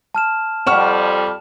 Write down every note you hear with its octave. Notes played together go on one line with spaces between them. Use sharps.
A5 F6 E7
F2 G3 F#5 C#6 F6 E7